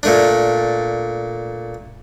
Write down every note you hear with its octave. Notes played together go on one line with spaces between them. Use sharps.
A#2 A3 D4